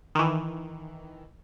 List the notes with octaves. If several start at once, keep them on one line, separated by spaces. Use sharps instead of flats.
D#3 E3